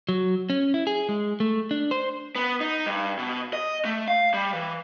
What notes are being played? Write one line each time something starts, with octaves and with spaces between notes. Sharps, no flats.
F#3
C#4
E4
G#4
G#3
A3
D4
C5
B3
D#4
G2
B2
D#5
A3
F5
G3
E3